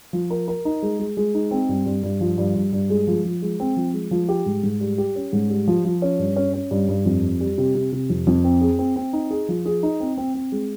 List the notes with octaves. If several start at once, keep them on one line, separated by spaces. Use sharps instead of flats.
F3
A#4
A#4
D#4
G#3
G#3
G#3
D#4
C4
G2
G2
G2
F3
G2
G2
G2
G#3
F3
F3
G#3
C4
F3
G#3
F3
G4
G#2
G#2
G3
G4
C#4
G#2
G3
F3
F3
C#4
G2
C#4
C#4
G2
G2
F2
G3
G3
C3
C3
C3
F2
F2
C4
G#4
C4
C4
D#4
G#4
F3
G#4
D#4
C4
C4
C4
G#3